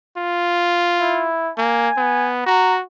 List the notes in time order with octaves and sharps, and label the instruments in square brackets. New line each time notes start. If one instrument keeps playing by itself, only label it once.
[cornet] F4
[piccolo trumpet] E4
[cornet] A#3 [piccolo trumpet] G#5
[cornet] B3
[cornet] F#4 [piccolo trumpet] A#5